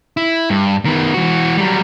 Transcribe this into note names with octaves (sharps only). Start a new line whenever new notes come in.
E4
G2
D#3 B3
E3 F#4
F#3 G3